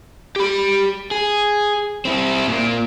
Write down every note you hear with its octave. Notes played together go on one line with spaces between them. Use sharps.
G4 B5
G#4
C4 E4
A#2 A#3